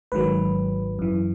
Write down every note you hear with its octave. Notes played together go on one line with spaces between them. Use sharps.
G#1 G#2 D#3 F#3 B4
F#2 E3